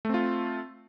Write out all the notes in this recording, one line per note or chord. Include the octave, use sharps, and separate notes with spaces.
A3 C4 F4